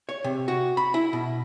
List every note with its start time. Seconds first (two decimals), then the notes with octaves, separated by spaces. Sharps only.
0.09 C#5
0.24 C3
0.48 F#4
0.77 B5
0.94 E4
1.13 B2